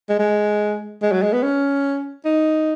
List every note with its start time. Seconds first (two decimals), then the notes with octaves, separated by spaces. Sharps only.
0.09 G#3
0.19 G#3
1.02 G#3
1.12 F#3
1.23 G#3
1.33 B3
1.43 C#4
2.25 D#4